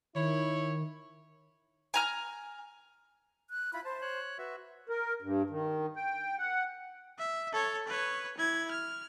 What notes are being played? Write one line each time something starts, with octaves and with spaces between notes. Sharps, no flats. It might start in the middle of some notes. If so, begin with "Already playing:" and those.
D#3 E4 C#5
G#5 A#5 F6
F#6
E4 F4 B5
C5 A5
C#5 F#6
F#4 B4 E5
A#4
G2
D#3
G5
F#5
E5
A4 C#5
B4 C#5
E4 G#6
F6